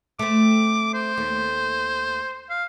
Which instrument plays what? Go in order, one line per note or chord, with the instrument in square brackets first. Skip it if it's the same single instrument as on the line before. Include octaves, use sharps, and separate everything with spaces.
[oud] A3 C4 [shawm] D6
[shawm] C5
[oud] D#2 A3
[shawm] F5